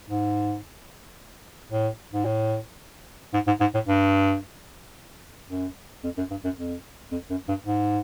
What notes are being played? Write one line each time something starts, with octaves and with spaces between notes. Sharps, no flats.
G#2
A2
G#2
A2
G#2
G#2
G#2
A2
G2
F#2
F2
F#2
G2
F#2
F2
F2
F#2
G2
G#2